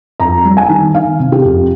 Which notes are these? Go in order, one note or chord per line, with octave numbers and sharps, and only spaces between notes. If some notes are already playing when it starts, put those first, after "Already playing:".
F2 A#5
G3
G#5
D#3
D#3 F5
C3
G4
F2